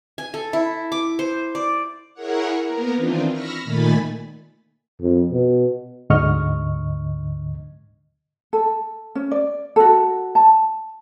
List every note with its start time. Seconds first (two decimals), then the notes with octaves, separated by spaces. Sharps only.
0.18 G#5
0.34 A4
0.53 E4
0.92 D6
1.19 C5
1.55 D5
2.14 E4 G#4 A#4 C#5 F#5
2.64 A#3 B3 A#4
2.95 D#3 E3 C4 D4 D#4 F4
3.31 B5 C#6 E6 F6 A#6
3.64 A#2 D#3 A3 G#5 B5 A6
5.01 F2
5.31 B2
6.10 D2 G#2 D3 D#5 C#6 F6
8.53 A4
9.15 C#4
9.31 D5
9.76 F#4 A4
10.35 A5